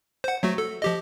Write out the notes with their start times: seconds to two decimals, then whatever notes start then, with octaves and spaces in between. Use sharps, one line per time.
0.24 C5 F#5
0.43 F#3 A3 F#4
0.58 A4
0.82 F3 G4 D#5